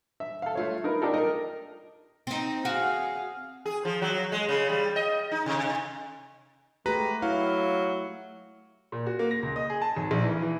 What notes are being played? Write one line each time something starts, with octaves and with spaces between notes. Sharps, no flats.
E5
A4 F5
A3 F4 C#5
D#4 A#4 B4
D4 D#4 F4 G4 A4 A#4
A#4 D#5
C4 D#4
F#4 G#4 F5
G#4
F3
F#3
G#3
C#3
G3
D#5
D#4
C3
G#3 A3 F#4 G4 B4 A#5
F#3 E4 F5
A#2
F#4
A#3
A#6
C#2
D#5
G#4
A5
G#1
A#1
E3
E3